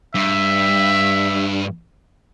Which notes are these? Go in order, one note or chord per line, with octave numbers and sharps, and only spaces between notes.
G2 E5